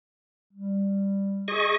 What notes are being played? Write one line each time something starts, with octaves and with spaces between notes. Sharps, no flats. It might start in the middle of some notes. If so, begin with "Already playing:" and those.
G3
G#4 D#5 C#6